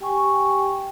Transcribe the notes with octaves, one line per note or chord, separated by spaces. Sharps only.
G4 G5 G#5 C#6